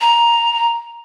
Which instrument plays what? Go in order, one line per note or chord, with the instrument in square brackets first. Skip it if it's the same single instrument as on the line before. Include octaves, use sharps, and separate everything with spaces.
[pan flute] A#5